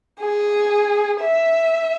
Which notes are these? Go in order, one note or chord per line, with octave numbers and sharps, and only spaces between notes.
G#4
E5